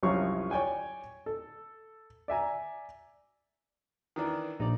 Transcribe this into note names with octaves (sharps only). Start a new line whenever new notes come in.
C2 F#2 F3 C#5 F5 C#6
C#5 D5 G5 G#5
A4
D5 E5 G#5 A#5
D#3 E3 D4
A#1 D#4 D5